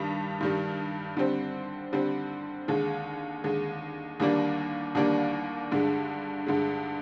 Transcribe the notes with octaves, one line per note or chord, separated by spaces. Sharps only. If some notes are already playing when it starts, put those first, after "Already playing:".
Already playing: G2 D#3 G3
G2 D#3 G3
D3 G3 C4
D3 G3 C4
D#2 D3 G#3
D#2 D3 G#3
D#2 D3 G3 A#3 D4
D#2 D3 G3 A#3 D4
G2 D3 G#3
G2 D3 G#3